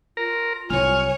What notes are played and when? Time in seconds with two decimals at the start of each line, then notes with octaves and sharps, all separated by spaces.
0.17 F4 A#4
0.70 C2 F#3 C#5 G#5 F6